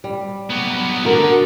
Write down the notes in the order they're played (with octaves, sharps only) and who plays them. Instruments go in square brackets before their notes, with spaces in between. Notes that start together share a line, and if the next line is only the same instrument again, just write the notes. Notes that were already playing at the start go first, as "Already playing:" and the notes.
[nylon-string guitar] G3
[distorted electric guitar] F#3 B3
[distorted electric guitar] D3 [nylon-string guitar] F#4 A#4